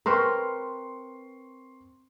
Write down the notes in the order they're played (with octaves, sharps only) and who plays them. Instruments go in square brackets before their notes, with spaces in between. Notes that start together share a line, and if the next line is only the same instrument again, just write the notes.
[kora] C4 A#4 B4 [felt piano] C6 C#6